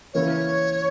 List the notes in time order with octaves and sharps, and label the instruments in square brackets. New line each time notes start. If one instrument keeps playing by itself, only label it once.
[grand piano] C#3 E3 A#3 E4 A#4 [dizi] C#5